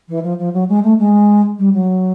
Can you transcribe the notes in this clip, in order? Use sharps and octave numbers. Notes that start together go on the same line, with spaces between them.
E3
F3
F3
F#3
G#3
A3
G#3
G3
F#3